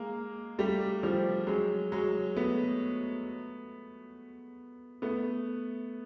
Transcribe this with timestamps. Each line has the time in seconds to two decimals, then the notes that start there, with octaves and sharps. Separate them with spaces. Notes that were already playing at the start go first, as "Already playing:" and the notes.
Already playing: G#3 A#3
0.59 G3 A3
1.03 F3 G3
1.47 F#3 G#3
1.92 F#3 G#3
2.36 A3 B3
5.02 A3 B3